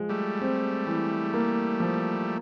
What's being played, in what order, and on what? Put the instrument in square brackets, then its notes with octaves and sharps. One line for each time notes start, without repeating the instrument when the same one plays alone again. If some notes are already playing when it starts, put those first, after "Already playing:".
Already playing: [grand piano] F3 G#3
[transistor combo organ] G3 A3
[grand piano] C4
E3
A#3
F3